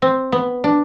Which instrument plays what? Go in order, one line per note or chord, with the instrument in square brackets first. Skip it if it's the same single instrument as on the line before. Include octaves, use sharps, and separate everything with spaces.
[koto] C4
B3
D4